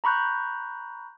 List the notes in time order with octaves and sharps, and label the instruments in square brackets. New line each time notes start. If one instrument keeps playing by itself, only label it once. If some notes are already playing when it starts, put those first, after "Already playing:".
[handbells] A#5 B5 C#6 F#6 G6